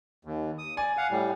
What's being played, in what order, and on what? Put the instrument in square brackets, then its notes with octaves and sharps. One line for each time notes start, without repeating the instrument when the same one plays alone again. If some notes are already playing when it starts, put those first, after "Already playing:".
[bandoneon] D#2
D#6
[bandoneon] D5 [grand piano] G#5
[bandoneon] F5 F#5
A2 G3